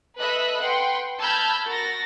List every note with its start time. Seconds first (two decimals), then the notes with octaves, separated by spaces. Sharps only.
0.19 A4 B4 D#5 E5 B5 F#6
0.60 B4 F#5 G5 C6
1.19 A5 B5 E6 F6 G6 G#6
1.65 F#4 A#4 A6 A#6